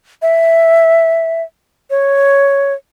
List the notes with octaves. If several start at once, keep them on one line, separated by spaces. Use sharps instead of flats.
E5
C#5